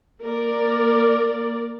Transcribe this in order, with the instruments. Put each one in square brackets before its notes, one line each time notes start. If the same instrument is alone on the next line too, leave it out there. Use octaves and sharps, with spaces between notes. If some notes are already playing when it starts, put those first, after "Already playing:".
[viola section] A#3 A#4 D5